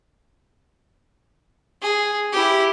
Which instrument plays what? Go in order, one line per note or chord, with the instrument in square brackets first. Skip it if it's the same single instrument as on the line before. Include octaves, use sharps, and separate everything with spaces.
[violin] G#4
E4 G4